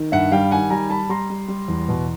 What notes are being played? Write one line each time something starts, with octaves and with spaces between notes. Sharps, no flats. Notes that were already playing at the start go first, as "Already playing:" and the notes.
Already playing: D#3
G2 E5 F#5
G3 F5 G5
D#3 F#5 G#5
G3 G#5 A#5
G3 A5 B5
G3 A#5 C6
G3
G3
E2
B2